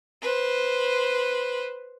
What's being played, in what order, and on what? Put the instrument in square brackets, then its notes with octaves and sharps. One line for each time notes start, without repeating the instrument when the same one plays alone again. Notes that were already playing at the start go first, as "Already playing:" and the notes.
[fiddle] B4 C5